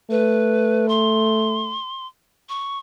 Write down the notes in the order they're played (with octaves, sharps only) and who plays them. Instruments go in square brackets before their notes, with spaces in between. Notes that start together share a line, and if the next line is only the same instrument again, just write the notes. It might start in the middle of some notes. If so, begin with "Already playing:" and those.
[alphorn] A3 [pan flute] B4
[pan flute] C6
C#6